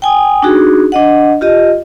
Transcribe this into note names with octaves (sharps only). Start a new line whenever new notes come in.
G5 G#5 D#6
D4 D#4 F#4 G#4
D4 D#5 F#5
F4 G4 D#5